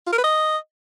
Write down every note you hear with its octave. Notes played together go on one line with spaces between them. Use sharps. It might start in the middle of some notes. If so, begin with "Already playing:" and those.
F4
A#4
B4
D#5